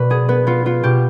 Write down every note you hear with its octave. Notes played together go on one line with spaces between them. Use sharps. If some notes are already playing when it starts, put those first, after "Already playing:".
Already playing: B2 B4 D5
B3 G#4
B3 B4
B3 F4
B3 F4
B2 G4